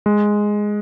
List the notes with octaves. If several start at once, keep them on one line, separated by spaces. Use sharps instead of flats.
G#3